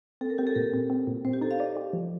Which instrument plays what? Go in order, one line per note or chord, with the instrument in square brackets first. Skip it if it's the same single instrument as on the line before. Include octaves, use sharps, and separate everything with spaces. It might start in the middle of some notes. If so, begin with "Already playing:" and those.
[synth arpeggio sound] C4 [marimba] A4
[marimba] A#4
[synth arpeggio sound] C4 [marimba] G4
[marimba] A4
[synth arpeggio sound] A#2 [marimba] A#4
[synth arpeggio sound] C4
C4
A#2
[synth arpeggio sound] C4 [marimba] C5
[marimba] G4
[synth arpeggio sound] D#4 [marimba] A4
[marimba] F5
[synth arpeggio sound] D5 [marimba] D#5
[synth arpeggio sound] G4
F3